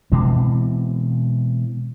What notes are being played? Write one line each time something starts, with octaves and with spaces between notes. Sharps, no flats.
B2 E3 G#3 C4